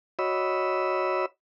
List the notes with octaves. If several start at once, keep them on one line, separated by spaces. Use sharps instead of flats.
F#4 C#5 D#5 B5 E6